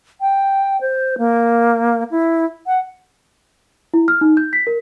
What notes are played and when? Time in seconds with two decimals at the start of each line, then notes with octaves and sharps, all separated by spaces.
0.21 G5
0.81 C5
1.18 A#3
2.11 E4
2.67 F#5
3.94 E4
4.08 F6
4.21 D#4
4.37 G6
4.53 B6
4.67 A#4